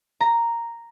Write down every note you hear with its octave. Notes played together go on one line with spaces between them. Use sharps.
A#5